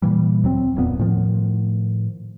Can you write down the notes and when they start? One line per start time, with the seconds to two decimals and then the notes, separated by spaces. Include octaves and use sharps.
0.02 A#2 E3 G3
0.44 D2 F#3 C4
0.76 D#1 F2 A#2 B3
0.99 A2 D#3 F3